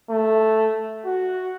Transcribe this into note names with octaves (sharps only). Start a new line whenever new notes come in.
A3
F#4